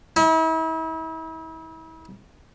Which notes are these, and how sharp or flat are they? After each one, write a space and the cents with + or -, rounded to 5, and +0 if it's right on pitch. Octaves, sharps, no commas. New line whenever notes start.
E4 -40